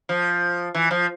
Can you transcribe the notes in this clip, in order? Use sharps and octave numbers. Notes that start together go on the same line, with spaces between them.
F3
E3
F3